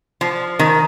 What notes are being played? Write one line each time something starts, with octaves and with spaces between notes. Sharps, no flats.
F3
D#3